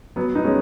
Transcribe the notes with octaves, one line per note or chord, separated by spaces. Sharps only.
F#3 B3
B3 D#4
G#3 C#4